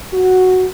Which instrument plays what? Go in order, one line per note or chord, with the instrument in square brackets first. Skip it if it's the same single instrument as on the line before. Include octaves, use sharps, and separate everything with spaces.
[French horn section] F#4